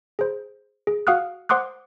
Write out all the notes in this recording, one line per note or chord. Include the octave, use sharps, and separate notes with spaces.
G#4 C5
G#4
F#4 F5 F#5 D#6 F6 F#6
C5 F#5 C6 D6 D#6 F#6